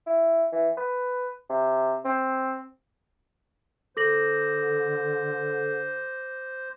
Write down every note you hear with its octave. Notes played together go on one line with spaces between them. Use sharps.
E4
E3
B4
C3
C4
D3 A4 C5 D6 A#6 F#7